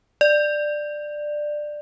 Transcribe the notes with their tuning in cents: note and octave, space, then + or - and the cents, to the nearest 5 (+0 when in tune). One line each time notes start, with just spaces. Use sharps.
D5 +15